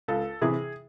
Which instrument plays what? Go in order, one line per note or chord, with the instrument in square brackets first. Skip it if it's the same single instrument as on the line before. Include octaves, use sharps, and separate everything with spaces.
[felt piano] C#2 A4
C3 E3 G#4